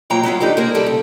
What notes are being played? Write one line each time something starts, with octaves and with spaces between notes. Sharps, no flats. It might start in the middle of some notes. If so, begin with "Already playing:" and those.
B2 F3 F#3 A#3 G5 A#5
F#3 B3 E4 F4
F2 D3 D#4 G4 D5
G#3 A#3 A#4
G3 G4 A4
C#3